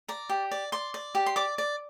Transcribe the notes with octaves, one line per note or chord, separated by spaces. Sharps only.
D5 A#5
G4
D5
D5 C6
D5
G4
C6
D5 D6
D5